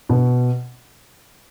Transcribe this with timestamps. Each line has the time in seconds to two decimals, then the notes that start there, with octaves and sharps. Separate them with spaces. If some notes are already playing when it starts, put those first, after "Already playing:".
0.09 B2